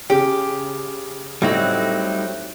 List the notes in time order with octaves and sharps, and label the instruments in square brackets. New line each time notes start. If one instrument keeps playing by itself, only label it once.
[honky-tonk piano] C#3 [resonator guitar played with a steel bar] G4
[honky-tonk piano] A2 [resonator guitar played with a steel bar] F#3 C4 [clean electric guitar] G3 D#4